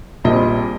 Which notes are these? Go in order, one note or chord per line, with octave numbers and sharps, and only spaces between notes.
A#1 A#2 G3 C4 D#5